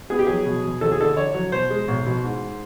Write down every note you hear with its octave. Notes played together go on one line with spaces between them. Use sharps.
B3 G#4
G4
F#3 G#4
B2
B2
D#2 A4
G#4
D3 A4
D3 C#5
F#3
B2 C5
G#3
B1
B2
G#2